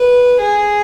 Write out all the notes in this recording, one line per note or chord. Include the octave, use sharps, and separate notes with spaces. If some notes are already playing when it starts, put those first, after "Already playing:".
Already playing: B4
G#4